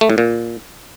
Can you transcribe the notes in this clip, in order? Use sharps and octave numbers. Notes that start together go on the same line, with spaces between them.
A3
A2
A#2